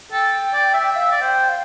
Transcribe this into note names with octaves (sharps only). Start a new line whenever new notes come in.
A4 G5
D5
E5
G5
E5 F5
D5
C5 G5
F5